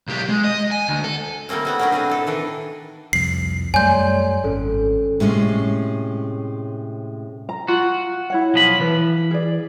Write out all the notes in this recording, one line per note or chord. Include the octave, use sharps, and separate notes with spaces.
B1 G4
G#3
D#5
G#5
D2
A4
G3 A3 A#3 C4 C#4
G3 B3 F#4
F#3 A#3 C#4 D4 G4
B2 C4 G#4
A2 A4
D#3 E3 D4
C2 F2 C7
F#2 G3 A3 C#5 D5 G#5 C6 G6
G#1 C#4 A4
A2 C3 G#3 C#4
A#5
F4 F#4
E4 C#5 F#5
B1 F3 B5
E3 B4
G#4 D5